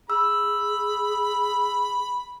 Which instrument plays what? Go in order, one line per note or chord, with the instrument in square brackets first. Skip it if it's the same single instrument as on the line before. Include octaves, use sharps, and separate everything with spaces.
[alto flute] G#4 [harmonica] B5 [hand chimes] E6